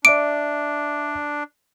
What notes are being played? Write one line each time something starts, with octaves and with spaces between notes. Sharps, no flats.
D4 D5 E5 D6 D7